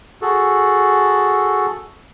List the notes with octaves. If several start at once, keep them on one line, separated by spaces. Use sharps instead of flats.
F#4 G#4 A4